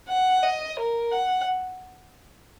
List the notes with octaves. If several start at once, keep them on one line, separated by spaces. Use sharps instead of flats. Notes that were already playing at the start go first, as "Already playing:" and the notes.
F#5
D#5
A#4
F#5